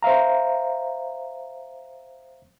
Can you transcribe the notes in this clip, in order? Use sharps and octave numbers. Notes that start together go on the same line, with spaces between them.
C5 E5 F5 A#5